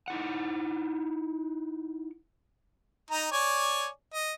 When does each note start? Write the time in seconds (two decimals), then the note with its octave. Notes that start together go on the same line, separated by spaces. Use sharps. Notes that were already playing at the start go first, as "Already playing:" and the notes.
0.08 D#4 E4 F#5
3.11 D#4 A#5
3.32 C#5 D5 G#5
4.14 D#5